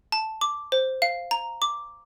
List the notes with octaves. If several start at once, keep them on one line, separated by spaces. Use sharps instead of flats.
A5
D6
C5
F5
A#5
D6